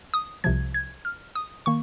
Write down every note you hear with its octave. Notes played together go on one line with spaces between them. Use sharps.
D#6
C2 C3 F3 G#6
G#6
F6
D#6
D#3 A#3 C#6